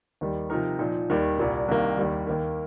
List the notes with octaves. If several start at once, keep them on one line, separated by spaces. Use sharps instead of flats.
D#2 D#3 G3
C3 F3 D#4 A#4
A#2 F3 D#4
D#2 D#3 G3
C2 A#2 G3
C2 C3 D#3 A#3
D#2 D#3 G3
D#2 D#3 A#3